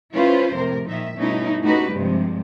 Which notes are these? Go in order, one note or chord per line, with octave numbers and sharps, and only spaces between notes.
C#4 E4 F4 B4 C5
F2 A2 C3 A#4
A#2 D#3 F3 D#4 E5
G2 B2 A3 C#4 D#4 E4
A3 C#4 D#4 F#4 G4 B4
G2 C3 F3 G#3